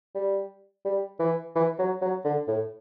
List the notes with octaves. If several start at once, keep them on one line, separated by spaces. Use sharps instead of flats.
G3
G3
E3
E3
F#3
F#3
D3
A2